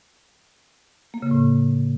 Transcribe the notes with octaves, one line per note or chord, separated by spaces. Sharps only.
A#3
C#3
A2